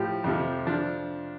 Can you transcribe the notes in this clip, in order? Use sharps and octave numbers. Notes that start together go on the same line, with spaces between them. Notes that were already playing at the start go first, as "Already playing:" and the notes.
Already playing: A2 F3 G4
F2 C3 F3
F3 D4